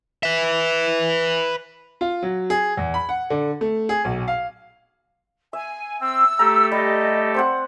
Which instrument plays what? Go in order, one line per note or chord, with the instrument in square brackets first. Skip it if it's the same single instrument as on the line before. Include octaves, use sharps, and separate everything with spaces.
[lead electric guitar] B4 E5
[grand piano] F4
F#3
G#4
E2
B5
F#5
D3
A3
G#4
B1
F5
[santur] E5 [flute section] G#5
[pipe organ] C4 [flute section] E6
[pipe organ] A3 G4 A4 [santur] A#5
[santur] G3 [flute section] D#5
[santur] C4 C5 F#5